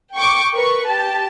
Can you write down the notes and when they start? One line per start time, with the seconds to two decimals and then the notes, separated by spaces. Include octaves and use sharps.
0.15 G5 C#6 D6
0.53 A#4 B4 C#6
0.86 G4 A5